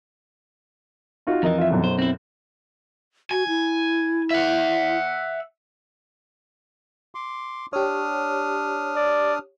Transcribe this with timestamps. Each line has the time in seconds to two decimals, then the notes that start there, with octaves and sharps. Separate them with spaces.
1.27 D#4 F4 F#4
1.43 F2 E3 A#4 D#5
1.58 F4 E5
1.70 B1 F#2
1.84 C5
1.99 C4 E4
3.31 F#4 G#5
3.48 E4
4.31 E5 F#5
7.15 C6 D6
7.73 D4 G4 C#5 D#6 F6
8.97 D5